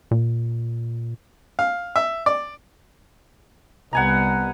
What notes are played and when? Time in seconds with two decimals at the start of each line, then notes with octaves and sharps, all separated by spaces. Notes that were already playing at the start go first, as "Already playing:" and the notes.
0.11 A#2
1.59 F5
1.96 E5
2.26 D5
3.93 C2 B3 F#5 G#5 A#5